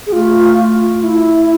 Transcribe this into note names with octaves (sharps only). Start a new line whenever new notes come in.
G#4
A3 F4
F4
F4
E4